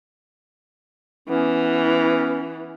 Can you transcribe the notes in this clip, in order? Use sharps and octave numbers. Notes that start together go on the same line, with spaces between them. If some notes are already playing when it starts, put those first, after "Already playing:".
E3 B3 C#4